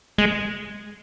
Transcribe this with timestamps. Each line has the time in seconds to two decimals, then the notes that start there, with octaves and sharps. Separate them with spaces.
0.18 G#3